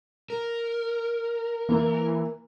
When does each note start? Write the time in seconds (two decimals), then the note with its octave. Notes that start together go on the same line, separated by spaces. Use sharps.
0.30 A#4
1.69 E3 A#3